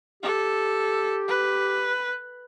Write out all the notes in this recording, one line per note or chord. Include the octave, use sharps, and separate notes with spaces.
G4 A4
B4